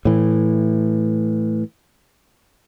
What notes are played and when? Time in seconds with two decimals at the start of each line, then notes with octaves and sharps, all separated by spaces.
0.05 A2 E3